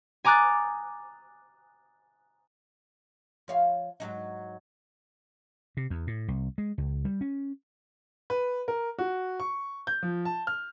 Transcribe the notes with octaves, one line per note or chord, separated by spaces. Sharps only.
G#5 A#5 D6 D#6 F#6 A6
F3 C#5 F5
G#2 F#3 D#4
C3
E2
A2
C2
G#3
C#2
G3
C#4
B4
A#4
F#4
C#6
G6
F3
A5
F6